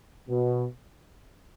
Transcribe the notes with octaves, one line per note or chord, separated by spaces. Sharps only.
B2